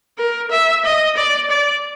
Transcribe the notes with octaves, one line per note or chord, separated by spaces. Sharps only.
A#4
E5
D#5
D5
D5